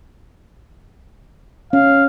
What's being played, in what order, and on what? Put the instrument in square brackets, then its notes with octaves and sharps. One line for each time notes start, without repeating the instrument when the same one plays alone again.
[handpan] C#4 [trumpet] F5